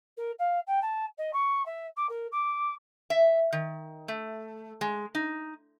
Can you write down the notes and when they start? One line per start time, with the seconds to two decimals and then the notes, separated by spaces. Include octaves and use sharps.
0.17 A#4
0.38 F5
0.67 G5
0.81 A5
1.17 D#5
1.33 C#6
1.65 E5
1.96 D6
2.09 A#4
2.31 D6
3.10 E5
3.53 D#3
4.08 A3
4.81 G#3
5.15 D#4